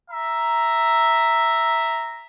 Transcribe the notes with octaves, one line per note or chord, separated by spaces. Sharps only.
E5 A#5